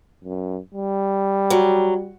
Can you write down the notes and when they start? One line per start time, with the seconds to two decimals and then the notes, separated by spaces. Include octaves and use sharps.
0.24 F#2
0.74 G3
1.50 F#3